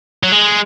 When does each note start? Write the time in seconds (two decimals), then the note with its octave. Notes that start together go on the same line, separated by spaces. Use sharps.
0.23 F#3
0.32 G#3